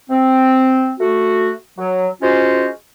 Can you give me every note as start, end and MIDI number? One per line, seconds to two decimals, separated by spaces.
0.10 0.92 60
0.99 1.53 57
0.99 1.53 66
1.78 2.07 54
2.21 2.69 56
2.21 2.69 61
2.21 2.69 65
2.21 2.69 66
2.21 2.69 72